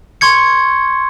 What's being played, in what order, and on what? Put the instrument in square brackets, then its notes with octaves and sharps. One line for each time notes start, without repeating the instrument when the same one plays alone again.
[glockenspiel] C6 C#6 G#6 C#7